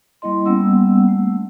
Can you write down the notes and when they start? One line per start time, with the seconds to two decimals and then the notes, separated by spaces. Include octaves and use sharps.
0.22 G3 A#3 E4 D#5 C6
0.46 G3 A#3 B3 C#4 F#5 E6
1.08 A3